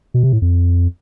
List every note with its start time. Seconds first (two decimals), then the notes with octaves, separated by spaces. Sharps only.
0.14 B2
0.23 C3
0.33 A2
0.42 F2